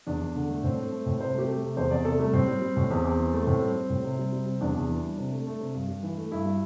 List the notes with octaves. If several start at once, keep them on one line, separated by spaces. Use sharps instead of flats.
E2 D4
E2
D3
A3
A2 C4
A3
A3
A2
C3 C5
A3 G4
A3
C3
E2 C5
E2 D5
C3 A4
G3 A3
A2 C4
G3
G3
A2
E2 C4
E2
E3
A3
A2 C4
G3
G3
A2
C3
G3
G3
C3
E2 D4
E2
E3
G3
C3
A3
A3
C3
G2
G2
E3
A3
G2 E4
G3